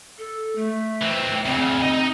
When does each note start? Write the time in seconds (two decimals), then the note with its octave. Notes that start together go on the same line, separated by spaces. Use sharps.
0.18 A4
0.56 A3
1.02 E3 C4
1.46 D2 C#3 C4
1.82 D#4 D#5